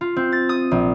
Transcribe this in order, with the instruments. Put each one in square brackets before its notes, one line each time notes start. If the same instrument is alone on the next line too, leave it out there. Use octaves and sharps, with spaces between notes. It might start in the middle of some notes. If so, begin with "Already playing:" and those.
[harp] F4
C4
A6
D#6
A#1